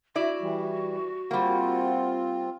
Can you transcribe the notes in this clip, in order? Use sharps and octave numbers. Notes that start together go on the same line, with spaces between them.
E4 F#4 D5
E3 G3
G3 A#3 C4 F4 F#5